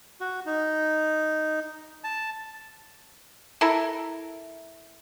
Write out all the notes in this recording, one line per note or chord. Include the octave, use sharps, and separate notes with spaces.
F#4
D#4
A5
E4 A4 A#4